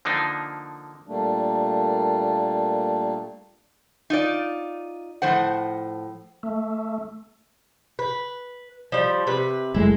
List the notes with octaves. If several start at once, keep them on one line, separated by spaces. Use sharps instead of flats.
D3 F3 A#3 D4 D#4
A#2 G3 A3 A#3 D4
D#4 F4 D5
A2 F3 C5 F#5
A3
B4
F3 G3
C3 B4
F#1 G#3 A3 E4